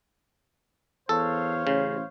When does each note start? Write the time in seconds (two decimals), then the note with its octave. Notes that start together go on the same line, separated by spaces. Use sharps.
1.09 E2 A4 C5 C#5 F5
1.67 A1 C#3